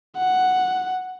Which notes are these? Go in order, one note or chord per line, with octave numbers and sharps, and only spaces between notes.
F#5